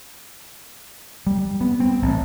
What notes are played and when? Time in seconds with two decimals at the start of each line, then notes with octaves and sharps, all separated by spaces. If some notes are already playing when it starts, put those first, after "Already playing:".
1.27 G3
1.61 B3
1.80 C4
2.02 A1